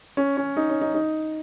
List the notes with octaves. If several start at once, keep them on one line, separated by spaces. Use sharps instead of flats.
C#4
C#4
D#4
C#4
D#4
D#4